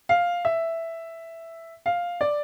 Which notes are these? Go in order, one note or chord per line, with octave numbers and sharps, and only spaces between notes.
F5
E5
F5
D5